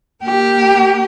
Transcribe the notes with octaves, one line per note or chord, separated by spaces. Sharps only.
A#3 G4